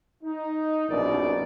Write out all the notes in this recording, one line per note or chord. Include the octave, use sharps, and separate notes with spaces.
D#4
A#1 F#2 B2 D#4 A#4 D5